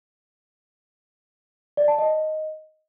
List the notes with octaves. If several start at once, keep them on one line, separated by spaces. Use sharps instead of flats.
D5
A5
D#5